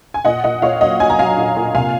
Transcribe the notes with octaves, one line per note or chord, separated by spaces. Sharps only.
G#5
A#2 D#5 F#5
A#2 D#5 F#5
A#2 C#5 F5
F#3 D#5 F#5
F#3 G#5
A#5
F#3 F5 G#5
A#2
A#2
C3 F5 G#5